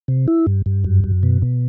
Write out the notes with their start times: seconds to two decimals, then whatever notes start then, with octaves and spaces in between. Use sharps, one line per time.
0.08 C3
0.28 E4
0.47 G2
0.66 G2
0.84 F#2
1.04 F#2
1.23 B2
1.42 B2